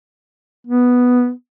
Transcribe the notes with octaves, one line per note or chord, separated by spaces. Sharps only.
B3